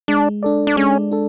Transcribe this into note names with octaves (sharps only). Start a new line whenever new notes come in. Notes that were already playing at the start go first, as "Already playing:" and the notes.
G#3 D4
D4 A4 D5
D4
G#3 C#4
D4 A4